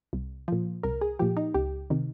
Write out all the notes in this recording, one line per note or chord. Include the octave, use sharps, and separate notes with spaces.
C2
A#2 F3
C2 A#4
G#4
A#2 F3 G4
D#4
C#2 G4
C3 D#3